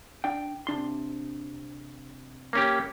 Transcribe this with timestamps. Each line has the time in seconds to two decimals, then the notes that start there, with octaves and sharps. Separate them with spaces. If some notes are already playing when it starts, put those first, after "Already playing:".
0.24 D4 G5
0.67 C3 D4 C6
2.53 A#3 C#4 G4